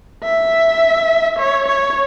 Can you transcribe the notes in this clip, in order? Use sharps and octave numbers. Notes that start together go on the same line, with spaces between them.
E5
C#5
C#5